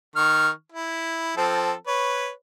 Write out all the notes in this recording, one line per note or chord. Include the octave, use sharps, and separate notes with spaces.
D#3 C#6 F6
E4
F3 C4 A4
B4 C#5